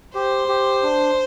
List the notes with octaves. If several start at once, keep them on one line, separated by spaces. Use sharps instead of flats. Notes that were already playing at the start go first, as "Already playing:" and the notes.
G4 C5
G4
D4